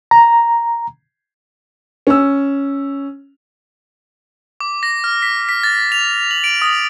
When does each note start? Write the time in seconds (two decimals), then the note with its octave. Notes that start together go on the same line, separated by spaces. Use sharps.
0.11 A#5
2.07 C#4 E6
4.60 D6
4.83 A#6
5.04 F6
5.22 B6
5.49 B6
5.63 A6
5.92 F7
6.31 F#7
6.44 D7
6.62 D#6